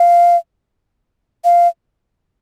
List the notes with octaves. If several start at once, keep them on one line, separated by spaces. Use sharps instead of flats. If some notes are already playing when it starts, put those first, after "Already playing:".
Already playing: F5
F5